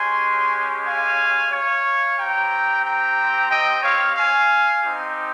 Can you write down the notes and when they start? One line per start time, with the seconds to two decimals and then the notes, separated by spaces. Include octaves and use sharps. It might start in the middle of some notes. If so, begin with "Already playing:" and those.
Already playing: G#3 C#4 G4 G#5 C6
0.86 F5 G#5
1.51 C#5 F5
2.18 C4 G4 G5 A#5
2.85 G5 A#5
3.50 D#5 G5
3.83 C#5 F5
4.16 F5 G#5
4.83 C4 D#4 G4